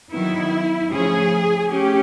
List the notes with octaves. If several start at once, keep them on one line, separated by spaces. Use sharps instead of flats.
D#3 F#3 B3 E4
C#3 F3 A3 C#4 G#4
A3 C#4 G4